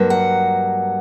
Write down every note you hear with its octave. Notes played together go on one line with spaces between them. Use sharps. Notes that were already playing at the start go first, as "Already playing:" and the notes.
Already playing: G2 F#3 A#3
F#5